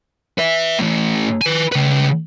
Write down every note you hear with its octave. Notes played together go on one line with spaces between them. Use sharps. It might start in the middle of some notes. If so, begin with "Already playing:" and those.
B4 E5
A2 E3
B4 G#5
C#3 B4